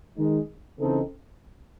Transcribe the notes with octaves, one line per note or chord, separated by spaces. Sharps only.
D#3 G#3 D#4
C#3 E3 C4 D#4 A4